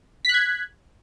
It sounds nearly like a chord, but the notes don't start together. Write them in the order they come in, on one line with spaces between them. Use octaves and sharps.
B6 F#6 G#6